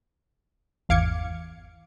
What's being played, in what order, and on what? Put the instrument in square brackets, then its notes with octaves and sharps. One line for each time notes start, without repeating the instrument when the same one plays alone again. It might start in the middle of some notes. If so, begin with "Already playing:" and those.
[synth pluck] G#1 E2 F5 D6 G#6 C#7